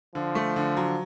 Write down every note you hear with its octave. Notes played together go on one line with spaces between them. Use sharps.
D3 F3
A3
D3
F#3